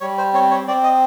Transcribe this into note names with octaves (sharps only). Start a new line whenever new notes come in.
G3 C#5
C5
C4 C#5
C#5
C4 D5
D#5